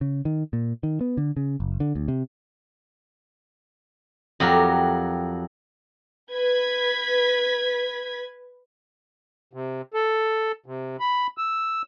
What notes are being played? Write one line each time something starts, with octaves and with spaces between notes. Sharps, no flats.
C#3
D#3
A#2
D#3
B3
D3
C#3
F#1
D3
D2
C3
F2 F#3 G4 A#4
B4 G#6 B6
C3
A4
C3
B5
E6